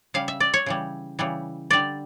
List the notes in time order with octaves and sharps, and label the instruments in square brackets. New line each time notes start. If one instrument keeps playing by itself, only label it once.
[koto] C#3 G3 F5
E5
D5
C#5
C#3 E3 G3
C#3 E3 G3
D3 G3 D5